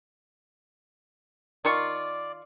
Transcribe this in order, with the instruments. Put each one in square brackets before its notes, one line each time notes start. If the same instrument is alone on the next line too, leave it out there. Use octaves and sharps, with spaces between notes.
[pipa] D#3 F4 C#6 [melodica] D5